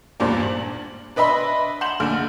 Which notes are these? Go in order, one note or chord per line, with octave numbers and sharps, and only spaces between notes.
G#1 E2 G2 A#2 C5 D5
F#7
D4 B4 D#5 E5 B5 C6
F#5 C6 G6 E7 F#7
A#1 D3 F6